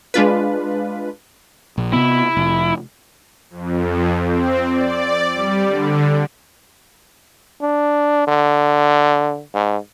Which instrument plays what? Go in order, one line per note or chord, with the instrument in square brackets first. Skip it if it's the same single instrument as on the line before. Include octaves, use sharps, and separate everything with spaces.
[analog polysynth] G#3 D4 F4 B4
[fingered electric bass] A#1
[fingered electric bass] C3 B3 [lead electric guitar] E4
[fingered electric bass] F1
[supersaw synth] F2
C4
D5
G3
D3
[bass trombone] D4
D3
G#2